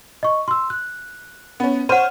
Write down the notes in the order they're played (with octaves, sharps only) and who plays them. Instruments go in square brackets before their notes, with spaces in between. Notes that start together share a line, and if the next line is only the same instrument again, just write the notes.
[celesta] D#5 C#6
C6 E6
F#6
[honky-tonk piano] B3 C#4
[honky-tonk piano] C5 C#5 F6 [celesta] F#5 D#7